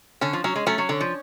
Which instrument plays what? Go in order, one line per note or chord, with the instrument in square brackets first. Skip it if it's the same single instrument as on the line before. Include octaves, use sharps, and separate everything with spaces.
[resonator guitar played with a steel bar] D3 [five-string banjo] C#4
[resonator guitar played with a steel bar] F3
[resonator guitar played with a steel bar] F#3 [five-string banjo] C#4
[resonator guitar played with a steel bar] G#3
[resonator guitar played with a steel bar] F#3 A3 [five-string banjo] C#4
[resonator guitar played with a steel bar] F#3
[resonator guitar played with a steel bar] D3 [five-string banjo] C#5
[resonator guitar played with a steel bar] F3